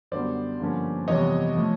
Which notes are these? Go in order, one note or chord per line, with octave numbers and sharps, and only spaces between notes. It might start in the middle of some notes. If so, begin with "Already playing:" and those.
F#2 D3 G3 B3 C5 D5
G2 D3 F3 A#3 C#4
F2 C3 E3 G3 B3 C#5 D#5
F3 A3